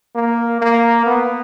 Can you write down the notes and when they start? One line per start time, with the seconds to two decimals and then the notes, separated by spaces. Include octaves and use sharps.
0.16 A#3
0.61 A#3
1.06 B3